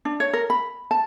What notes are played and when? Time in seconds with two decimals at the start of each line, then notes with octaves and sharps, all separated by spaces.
0.05 D4
0.20 C#5
0.33 A#4
0.50 B5
0.91 A5